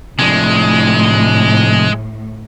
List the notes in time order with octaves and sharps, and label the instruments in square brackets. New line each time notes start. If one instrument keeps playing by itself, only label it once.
[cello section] A2 [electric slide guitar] C3 F3 D4 [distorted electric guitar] G#3